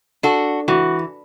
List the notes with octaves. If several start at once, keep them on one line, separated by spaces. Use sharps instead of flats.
D4 F#4 A4
E3 F#4